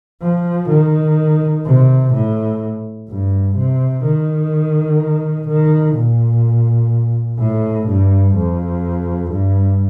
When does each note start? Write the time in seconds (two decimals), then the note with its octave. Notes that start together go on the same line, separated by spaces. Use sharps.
0.22 F3
0.70 D#3
1.65 C3
2.13 A2
3.09 G2
3.57 C3
4.05 D#3
5.48 D#3
5.96 A#2
7.40 A2
7.88 G2
8.36 F2
9.32 G2